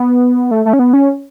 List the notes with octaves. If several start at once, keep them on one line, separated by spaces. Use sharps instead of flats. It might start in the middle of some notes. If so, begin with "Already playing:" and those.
Already playing: B3
A3
A3
C#4
B3
C#4